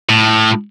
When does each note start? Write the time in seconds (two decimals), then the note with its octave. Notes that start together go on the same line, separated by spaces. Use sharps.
0.09 A2